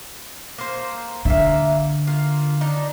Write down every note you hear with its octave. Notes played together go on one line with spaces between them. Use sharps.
A#3 C5
D3 A#3 E5
A#3 F4
D4 D#4